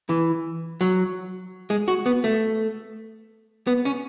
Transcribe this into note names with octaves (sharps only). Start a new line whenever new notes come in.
E3
F#3
G#3
F#4
B3
A3
B3
C#4